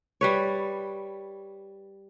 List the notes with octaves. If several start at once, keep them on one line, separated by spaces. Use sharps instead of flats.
G3 B4 C#5